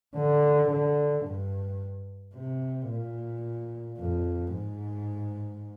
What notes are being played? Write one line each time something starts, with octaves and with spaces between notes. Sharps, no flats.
D3
D3
G2
C3
A#2
F2
G#2